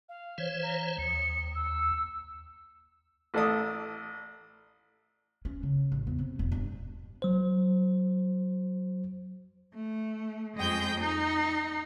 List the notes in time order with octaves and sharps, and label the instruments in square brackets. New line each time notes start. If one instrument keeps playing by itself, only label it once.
[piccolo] F5
[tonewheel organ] E3 C5 C#5
[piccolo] A#5
[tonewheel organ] D#2 [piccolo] C#7
[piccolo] E6
[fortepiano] A1 A3 A4 D5 D#6
[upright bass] C#4
C#3
A1
E2
C3
E1
G2
[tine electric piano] F#3 C5
[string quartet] A3
F2 G#3 D#5 G5 G6
D#4